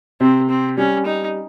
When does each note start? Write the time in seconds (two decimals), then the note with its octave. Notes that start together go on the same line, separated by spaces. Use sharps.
0.21 C3 C4
0.49 C4
0.77 G3 C#4
1.05 D#4